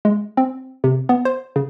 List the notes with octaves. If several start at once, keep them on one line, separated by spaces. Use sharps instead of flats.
G#3
C4
C3
B3
C5
C#3